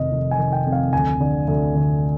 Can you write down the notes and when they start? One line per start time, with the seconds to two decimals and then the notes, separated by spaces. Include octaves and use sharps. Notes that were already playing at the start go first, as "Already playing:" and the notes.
Already playing: F1 F2 D#3 D#5
0.11 F1
0.31 G#5
0.38 D#3
0.52 G5
0.66 F2
0.72 F5
0.93 D2 G#5
1.20 D3
1.48 D2
1.75 D3